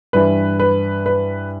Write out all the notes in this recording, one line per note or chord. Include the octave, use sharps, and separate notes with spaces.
G2 E3 B4
B4
B4